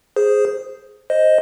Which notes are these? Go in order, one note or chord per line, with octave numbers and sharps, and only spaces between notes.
G#4 C5
C5 D#5